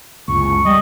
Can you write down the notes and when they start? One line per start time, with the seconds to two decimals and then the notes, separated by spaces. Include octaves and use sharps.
0.28 F#1 C#2 C#6
0.65 G3 D#5